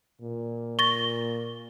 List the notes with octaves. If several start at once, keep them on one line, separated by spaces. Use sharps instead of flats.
A#2
C#6 A6 A#6 G7